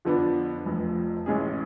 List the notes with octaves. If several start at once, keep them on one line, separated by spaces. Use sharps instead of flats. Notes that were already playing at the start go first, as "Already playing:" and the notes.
F2 D3 F3 B3 D4
F1 F2 F3
A1 A2 G#3 C#4 G#4